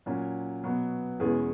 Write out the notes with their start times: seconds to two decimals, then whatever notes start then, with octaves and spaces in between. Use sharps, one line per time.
0.06 A#2 F#3 C#4
0.64 B2 F#3 B3
1.20 E2 B2 G#3 C#4 G#4